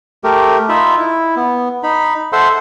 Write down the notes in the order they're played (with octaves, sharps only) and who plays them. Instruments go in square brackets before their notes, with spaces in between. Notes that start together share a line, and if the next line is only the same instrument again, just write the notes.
[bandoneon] A3 G4 A#4
D#4 F4 E5 B5
E4
B3
D#4 B5
A4 C5 E5 F#5 C6